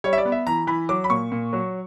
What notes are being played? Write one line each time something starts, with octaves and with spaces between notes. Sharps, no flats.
G3 C#5
E5
D5
B3
E5
E3 A#5
E3 B5
F#3 D6
B5
A#2 C#6
A#2
F#3